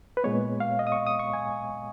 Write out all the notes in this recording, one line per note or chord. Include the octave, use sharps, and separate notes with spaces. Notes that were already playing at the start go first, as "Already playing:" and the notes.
B4
A#2 G#3 B3 C#5
F5
D#5
D#6
C#6
D#6
C#6
G#5